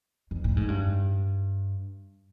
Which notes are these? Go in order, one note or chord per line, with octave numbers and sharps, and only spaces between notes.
F2
A2
G#2
G2